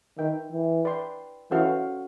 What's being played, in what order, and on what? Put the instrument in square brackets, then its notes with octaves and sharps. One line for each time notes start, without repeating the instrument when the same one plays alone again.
[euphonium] D#3 [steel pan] B4 E5 G5
[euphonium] E3
[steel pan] B4 D5 G5 C6
[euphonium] E3 [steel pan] C#4 F#4 A4 C5 F5